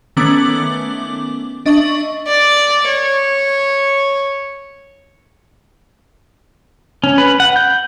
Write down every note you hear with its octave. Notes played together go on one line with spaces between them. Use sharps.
D#3 A3 B3 C#4 D6 F#7
D4 D#5 E5 C#6 A6 F#7
D5
C#5
C#4
B4
F#5
G6